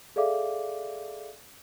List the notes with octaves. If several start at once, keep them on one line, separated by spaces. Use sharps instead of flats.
G#4 A4 D5 E5 F5 D6